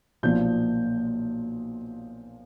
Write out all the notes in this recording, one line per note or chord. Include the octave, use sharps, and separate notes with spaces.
B1 A#2 F3 G6